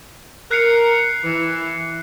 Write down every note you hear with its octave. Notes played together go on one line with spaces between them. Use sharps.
A#4 F#6 C7 C#7
E3